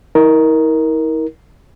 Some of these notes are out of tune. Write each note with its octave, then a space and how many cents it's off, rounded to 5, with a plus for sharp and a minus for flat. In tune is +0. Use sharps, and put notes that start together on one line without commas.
E4 -45 A#4 +10